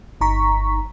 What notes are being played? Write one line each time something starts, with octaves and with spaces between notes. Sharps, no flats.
G1 D#4 A#5 C#6 B6